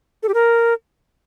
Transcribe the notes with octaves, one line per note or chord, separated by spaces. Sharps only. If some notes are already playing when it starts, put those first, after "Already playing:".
A4
G4
A#4